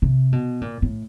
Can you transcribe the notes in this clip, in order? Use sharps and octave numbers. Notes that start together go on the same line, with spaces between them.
C3
B2
A#2
A2